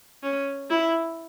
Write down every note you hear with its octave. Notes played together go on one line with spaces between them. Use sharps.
C#4
E4